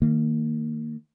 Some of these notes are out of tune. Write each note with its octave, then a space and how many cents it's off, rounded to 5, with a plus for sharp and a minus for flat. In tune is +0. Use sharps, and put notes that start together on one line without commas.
D#3 +0 A#3 -25